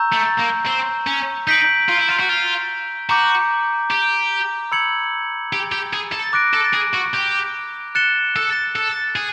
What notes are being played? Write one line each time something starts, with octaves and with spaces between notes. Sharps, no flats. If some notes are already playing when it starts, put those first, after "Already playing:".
Already playing: A#5 C#6 E6 G6
A3
A#3
C4
C#4
D#4 G6 B6 D7 F#7
F4
E4
F4
F#4
F4
F#4 A#5 D6 G6
G4
B5 E6 G#6 C#7 F#7
G4
G4
G#4
A4
D6 F#6 A#6 D7
A4
G#4
F#4
G4
F#6 A6 C#7 E7 G7
A4
A4
G#4